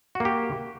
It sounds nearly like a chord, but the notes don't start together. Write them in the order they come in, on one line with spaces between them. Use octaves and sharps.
F#4 A#3 G4